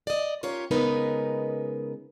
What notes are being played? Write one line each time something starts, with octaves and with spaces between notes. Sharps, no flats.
D5 D#5
C#4 F4 G4 A#4 C#5
C#3 G#3 B3 D#4 A#4 B4